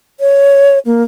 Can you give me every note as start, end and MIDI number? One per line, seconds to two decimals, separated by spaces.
0.20 0.79 73
0.86 1.03 58